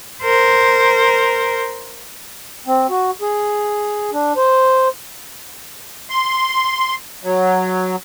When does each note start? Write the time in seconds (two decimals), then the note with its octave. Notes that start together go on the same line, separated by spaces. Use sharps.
0.22 A#4 C5
2.67 C4
2.90 F#4
3.21 G#4
4.13 D4
4.36 C5
6.10 C6
7.24 F#3